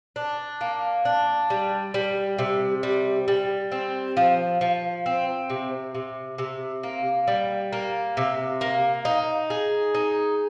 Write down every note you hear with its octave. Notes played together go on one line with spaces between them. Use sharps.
D4
A#3
D4
G3
G3
C3
G3
G3
C4
F3
F3
C4
C3
C3
C3
A#3
G3
A#3
C3
A#3
D#4
G#4
D#4